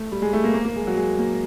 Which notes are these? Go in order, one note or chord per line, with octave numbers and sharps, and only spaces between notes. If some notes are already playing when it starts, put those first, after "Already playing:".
Already playing: A3
G3
G#3
A3
A#3
A#3
A#3
G#3
F#3
G#3
A#3